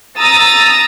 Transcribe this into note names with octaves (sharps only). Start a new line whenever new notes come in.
A#5 D#6 E6 A6